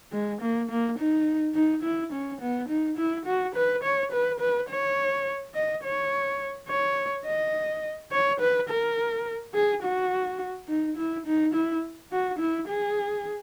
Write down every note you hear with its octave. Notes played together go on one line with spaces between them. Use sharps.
G#3
A#3
A#3
D#4
D#4
E4
C#4
B3
D#4
E4
F#4
B4
C#5
B4
B4
C#5
D#5
C#5
C#5
D#5
C#5
B4
A#4
G#4
F#4
D#4
E4
D#4
E4
F#4
E4
G#4